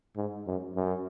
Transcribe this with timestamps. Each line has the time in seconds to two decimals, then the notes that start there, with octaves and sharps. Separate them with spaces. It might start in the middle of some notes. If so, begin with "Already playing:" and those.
0.17 G#2
0.47 F#2
0.76 F#2